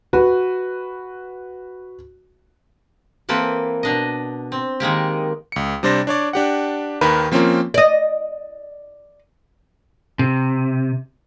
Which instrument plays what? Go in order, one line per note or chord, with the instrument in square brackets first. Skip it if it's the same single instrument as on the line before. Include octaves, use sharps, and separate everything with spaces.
[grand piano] F#4 B4
[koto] E3 A#3 C4 A4 B4
B2 D4 D#5
C4
D#3 G#3 A#3 G4
[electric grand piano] C#2 C#7
C3 G3 D4 C5 A6 A#6
D4 C#5 D5
D4 G4 F#5
D#2 D#3 A#4 B4 B5
F3 A#3 C4 C#4 F4 A#4
[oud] D5 D#5
[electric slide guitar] C3